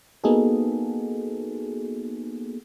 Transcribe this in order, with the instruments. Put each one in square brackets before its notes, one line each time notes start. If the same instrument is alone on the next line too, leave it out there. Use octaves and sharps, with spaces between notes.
[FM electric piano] A#3 B3 D#4 F#4 G#4 A4